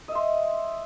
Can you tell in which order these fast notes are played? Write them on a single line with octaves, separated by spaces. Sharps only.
D#5 E5 C6